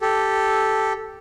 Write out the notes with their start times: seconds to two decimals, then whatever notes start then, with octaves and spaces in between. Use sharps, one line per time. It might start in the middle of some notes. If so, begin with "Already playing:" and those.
0.01 G4 A4